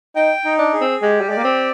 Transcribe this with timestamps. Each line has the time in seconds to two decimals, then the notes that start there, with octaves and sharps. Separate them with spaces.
0.16 D#4 G5
0.45 D#4
0.59 D4
0.73 G#4
0.81 C4
1.02 G#3 G4
1.21 G3
1.29 G#3 D5
1.37 A#3
1.44 C4